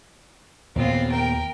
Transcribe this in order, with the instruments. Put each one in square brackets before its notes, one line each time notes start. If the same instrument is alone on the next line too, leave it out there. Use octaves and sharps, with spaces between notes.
[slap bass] D#2 A#2 B3 [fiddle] C4 F4
[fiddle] A#4 G5